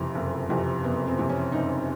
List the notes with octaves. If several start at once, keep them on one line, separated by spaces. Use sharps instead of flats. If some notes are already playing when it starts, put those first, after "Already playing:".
Already playing: F#1 F2 C3 E3
F#1
F2 C3 E3
F#1 B3
C4
F2 C3 E3
C#4
F#1 D#4